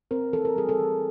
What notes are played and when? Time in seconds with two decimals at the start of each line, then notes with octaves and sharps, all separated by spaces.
0.11 C4 A#4
0.33 E3 A4
0.45 A#4
0.56 G3 G#4
0.69 A4
0.80 E3